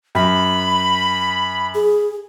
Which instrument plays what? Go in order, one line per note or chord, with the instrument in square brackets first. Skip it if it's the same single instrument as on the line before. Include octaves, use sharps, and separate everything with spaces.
[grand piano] F#2 [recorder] B5
[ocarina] G#4